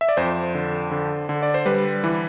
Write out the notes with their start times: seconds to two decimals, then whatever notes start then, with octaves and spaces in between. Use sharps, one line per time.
0.01 E5
0.09 D5
0.17 F2 C5
0.55 D3
0.91 D3
1.29 D3
1.43 D5
1.54 C5
1.66 G3 B4
2.04 E3